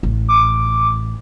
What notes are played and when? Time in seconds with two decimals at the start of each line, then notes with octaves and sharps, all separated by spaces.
0.03 A1
0.28 D6